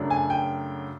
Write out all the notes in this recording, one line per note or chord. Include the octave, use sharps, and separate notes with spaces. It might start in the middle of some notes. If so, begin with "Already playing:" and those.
Already playing: F#2 C#3 F#3 A3 D4
G#5
G5